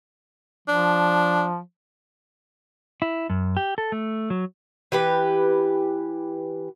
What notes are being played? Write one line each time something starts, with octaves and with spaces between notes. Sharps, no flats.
F3 D4
E4
F#2
G4
A4
A3
F#3
E3 G4 B4